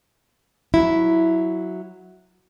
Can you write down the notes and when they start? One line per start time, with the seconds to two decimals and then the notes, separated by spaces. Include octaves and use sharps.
0.74 F#3 E4